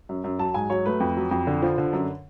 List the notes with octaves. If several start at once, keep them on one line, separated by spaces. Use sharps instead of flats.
F#2
F#2
F#3 A5
G#2 G#5
F#3 C#5
A3 B4
F2
F#3
F2
D3
F3
D3
F#2